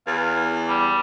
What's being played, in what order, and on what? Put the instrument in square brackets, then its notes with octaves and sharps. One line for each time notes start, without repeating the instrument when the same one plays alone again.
[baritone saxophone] E2 [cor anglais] F5
[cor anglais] G3